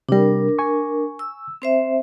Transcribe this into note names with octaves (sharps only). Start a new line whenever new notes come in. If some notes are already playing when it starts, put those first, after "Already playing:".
C3 G3 D4 A#4
G#5 C#6
E6
C4 C5 E5